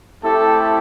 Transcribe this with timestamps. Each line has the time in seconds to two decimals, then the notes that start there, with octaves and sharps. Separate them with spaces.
0.23 A3 C4 E4 G4 A4